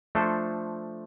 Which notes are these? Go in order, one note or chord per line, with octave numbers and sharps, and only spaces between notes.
F3 A3 D4 A4 C5